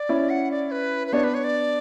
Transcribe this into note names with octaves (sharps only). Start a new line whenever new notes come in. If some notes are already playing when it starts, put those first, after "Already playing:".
Already playing: D5
C#4 E4
F#5
D5
B4
B4
B3 D4 C#5
B4
C#5
D5